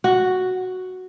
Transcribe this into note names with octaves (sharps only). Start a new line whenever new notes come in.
F#4